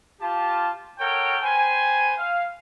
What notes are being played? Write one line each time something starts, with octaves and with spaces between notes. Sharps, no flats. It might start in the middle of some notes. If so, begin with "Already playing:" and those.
F4 G4 A5
A4 A#4 C#5 F#5 G5
B4 C5 G5 G#5
F5